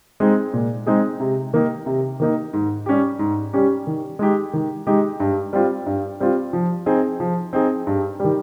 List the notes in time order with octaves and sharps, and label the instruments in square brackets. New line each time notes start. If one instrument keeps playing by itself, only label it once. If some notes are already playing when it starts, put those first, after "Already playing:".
[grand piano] G#3 C4 D#4 G#4
A#2
G#3 C4 D#4 G#4
C3
D#3 A#3 D#4
C3
D#3 A#3 D#4
G#2
G3 C#4 G4
G#2
G3 C#4 G4
D#3
G#3 D#4 G4
D#3
G#3 D#4 G4
G2
G3 C4 F4
G2
G3 C4 F4
F3
C4 D#4 G#4
F3
C4 D#4 G#4
G2
D#3 G3